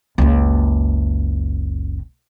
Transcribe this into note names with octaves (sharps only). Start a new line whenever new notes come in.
F#1 C#2